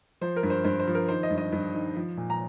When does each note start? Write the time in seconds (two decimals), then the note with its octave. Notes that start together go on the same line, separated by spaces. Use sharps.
0.21 F3 C5
0.36 A#4
0.43 G2
0.50 C5
0.64 G2 C5
0.79 C5
0.87 F3
0.95 A#4
1.08 D#3 C5
1.23 D#5
1.30 G2
1.38 D#5
1.52 G2
1.73 D#3
1.96 F3
2.17 A#2
2.30 A#5